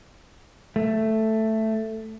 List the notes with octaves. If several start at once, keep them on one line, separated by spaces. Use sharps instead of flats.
A3